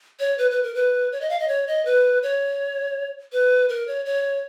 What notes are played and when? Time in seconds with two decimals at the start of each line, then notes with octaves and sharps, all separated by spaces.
0.20 C#5
0.38 B4
0.51 B4
0.63 A#4
0.75 B4
1.12 C#5
1.21 D#5
1.29 F5
1.39 D#5
1.48 C#5
1.67 D#5
1.85 B4
2.23 C#5
3.32 B4
3.69 A#4
3.87 C#5
4.05 C#5